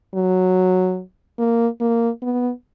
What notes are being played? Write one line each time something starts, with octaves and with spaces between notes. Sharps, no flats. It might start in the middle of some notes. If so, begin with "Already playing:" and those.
F#3
A#3
A#3
B3